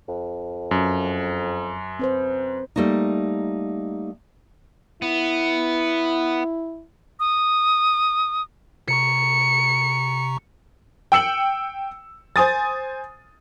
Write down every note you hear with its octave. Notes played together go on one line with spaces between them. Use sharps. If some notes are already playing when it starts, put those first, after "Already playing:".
F2
F#2
C4 B4 C5
G3 A3 A#3 D#4
B3 E4
D#6
C3 A#5 C#6 C#7
G5 E6 C#7 F#7
C5 G#5 D#6 A6